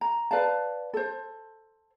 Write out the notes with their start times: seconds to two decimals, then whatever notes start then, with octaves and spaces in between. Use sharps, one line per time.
0.01 A#5
0.31 B4 D5 F5 A5
0.94 A4 C5